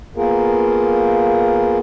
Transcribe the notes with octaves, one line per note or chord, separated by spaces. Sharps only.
A#3 B3 F4 G#4 A#4